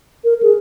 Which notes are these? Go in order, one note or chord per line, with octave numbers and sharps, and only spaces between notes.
A#4
G#4